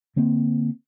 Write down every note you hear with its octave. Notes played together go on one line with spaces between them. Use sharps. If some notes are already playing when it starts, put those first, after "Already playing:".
D3 A#3 C4